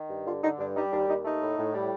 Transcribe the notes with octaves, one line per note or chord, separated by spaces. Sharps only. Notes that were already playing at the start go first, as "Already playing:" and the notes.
Already playing: D#3
G2
D3 F4
D3 D#4
G2 D4
G3 D#4
D#2 D4
D#2 D#4
A3 D#4
A2
A2
G3